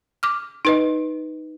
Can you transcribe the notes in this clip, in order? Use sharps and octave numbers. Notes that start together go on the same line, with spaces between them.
D6 F6
D#4 B4 D#5